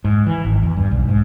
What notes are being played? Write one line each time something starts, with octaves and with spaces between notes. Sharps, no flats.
G#2
E3
G#1
E2
G2
B1
G#2